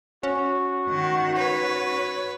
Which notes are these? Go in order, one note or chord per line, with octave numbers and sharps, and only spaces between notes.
C#4 F#4
D#3 F#5
B4 C#5